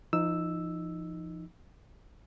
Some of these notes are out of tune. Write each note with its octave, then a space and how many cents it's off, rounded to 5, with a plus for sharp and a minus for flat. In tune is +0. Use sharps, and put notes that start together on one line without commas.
F3 -35 D#4 +0 E6 +0